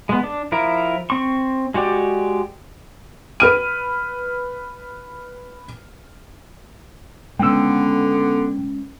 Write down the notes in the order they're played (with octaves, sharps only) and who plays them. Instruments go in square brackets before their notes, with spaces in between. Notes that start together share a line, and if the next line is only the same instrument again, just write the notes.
[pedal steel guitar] G#3 B3
D4
F3 E4 A#4
C4 C#6
G#3 F#4 G4 D5
[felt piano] B4 F6 D#7
[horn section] D3 B3 [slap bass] G#3 C#4 [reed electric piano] G5 E6